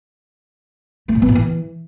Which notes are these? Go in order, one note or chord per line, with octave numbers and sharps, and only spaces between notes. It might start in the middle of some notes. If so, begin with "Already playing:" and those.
A3
A#2
B3
A#2
E3